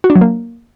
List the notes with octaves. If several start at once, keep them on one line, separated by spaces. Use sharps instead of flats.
F#4
D4
F#3
A#3